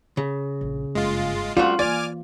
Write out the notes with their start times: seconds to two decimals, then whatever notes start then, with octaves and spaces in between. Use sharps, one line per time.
0.17 C#3
0.61 A#1
0.95 F#1 G2 G#3 F4
1.57 G3 A3 C4 C#4 F4 F#4
1.79 E3 A#3 D5 G#5 D6 F6